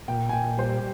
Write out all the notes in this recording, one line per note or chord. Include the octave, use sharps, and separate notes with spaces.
A#2 G5
G#5
A#2 G5
G3 C5